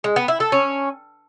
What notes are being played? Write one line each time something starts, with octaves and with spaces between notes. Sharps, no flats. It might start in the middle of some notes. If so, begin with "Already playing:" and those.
G#3
B3
E4
A4
C#4